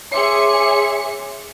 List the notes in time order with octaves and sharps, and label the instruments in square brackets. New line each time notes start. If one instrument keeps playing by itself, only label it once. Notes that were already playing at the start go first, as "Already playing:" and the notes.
[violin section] G#4 E5 C#7 [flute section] C#5 C6 D6